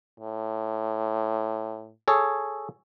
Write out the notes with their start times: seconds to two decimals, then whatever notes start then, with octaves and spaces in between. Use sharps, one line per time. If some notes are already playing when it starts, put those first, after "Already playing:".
0.20 A2
2.08 G#4 A4 C#5